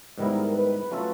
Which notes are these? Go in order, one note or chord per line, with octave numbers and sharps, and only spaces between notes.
G#2 D#3 G3 B3 E4 A#4
B4
F#3 A3 C#4 F4 A4